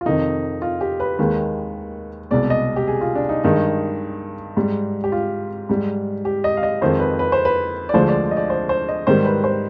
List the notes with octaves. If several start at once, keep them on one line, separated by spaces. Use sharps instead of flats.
F4
F2 C3 D#3 D#4
F4
G4
B4
D#2 D#3 G#3
C2 B2 G#3 D5
D#5
G4
G#4
F4
D4
D#4
G2 D#3 G#3 D#4
G#2 G3
G4
F4
G#2 G3
G4
D#5
F5
D#5
F2 D#3 G#3 C5
B4
B4
C5
B4
D5
D2 D3 F3 G#3 C5
D5
D#5
D5
C5
C5
D#5
G#2 D#3 G3 C5
B4
C5